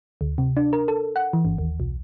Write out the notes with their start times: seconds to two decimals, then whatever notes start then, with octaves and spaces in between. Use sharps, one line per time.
0.21 D2
0.38 C3
0.57 D4
0.73 A#4
0.88 A4
1.16 F#5
1.33 E3
1.45 G1
1.58 D#2
1.80 B1